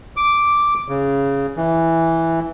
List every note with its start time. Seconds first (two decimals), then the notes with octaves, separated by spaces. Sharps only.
0.17 D6
0.88 C#3
1.57 E3